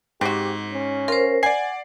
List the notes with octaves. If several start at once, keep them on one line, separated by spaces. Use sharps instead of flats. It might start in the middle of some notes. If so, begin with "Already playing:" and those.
G#2 C4 F#4 G4
C#4
F4 A#4 C5
D5 F#5 G#5 C7